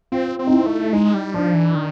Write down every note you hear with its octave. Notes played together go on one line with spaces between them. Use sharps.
C4 F4
C4
D#4
E4
A3
G#3 D#4
G3
F3 D4
E3
D#3